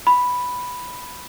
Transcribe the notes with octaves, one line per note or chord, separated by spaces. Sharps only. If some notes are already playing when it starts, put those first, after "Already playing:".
B5